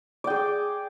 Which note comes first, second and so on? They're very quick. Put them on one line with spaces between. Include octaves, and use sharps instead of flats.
D5 G5 G#4